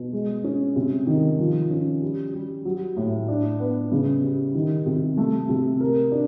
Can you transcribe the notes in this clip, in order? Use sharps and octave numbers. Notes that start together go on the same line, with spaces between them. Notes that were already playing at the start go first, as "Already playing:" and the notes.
Already playing: B2
G#3
C#4
C3
D#3
F3
C#4
G3
G3
F#3
A2
D4
B3
C#3
G3
D#3
C3
A3
C3
A#4
D4